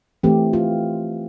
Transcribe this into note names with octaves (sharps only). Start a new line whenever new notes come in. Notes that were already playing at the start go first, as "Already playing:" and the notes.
E3 A3 C4 G4
F4